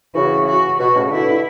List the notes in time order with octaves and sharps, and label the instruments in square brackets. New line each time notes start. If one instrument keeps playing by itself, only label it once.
[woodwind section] C#3 E3 [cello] F#4
[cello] F#4
[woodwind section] B2 [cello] F#4
[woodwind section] A2 C#3
[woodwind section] B2 D3 [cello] E4